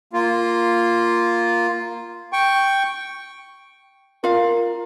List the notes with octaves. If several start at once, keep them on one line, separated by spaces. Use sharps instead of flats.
A#3 F4
G5 C#6
F4 A#4 F5